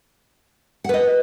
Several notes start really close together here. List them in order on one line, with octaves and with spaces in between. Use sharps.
F#5 B4 D#5